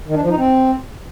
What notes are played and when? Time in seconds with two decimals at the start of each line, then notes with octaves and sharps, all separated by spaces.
0.08 D#3
0.15 D4
0.23 F3
0.30 D#4
0.38 C4